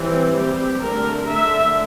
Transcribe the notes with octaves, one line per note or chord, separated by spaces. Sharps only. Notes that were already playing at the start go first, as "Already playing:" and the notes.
Already playing: E3 G3 C4
G3 C4 G4
D3 A3 D4 A#4
D3 A3 D4 E5